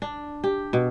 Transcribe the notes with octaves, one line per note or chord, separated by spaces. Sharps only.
D4
G4
B2